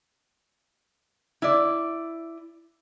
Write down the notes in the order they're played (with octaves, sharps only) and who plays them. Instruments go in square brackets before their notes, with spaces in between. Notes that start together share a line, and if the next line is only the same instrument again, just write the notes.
[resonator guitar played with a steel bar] E4 D5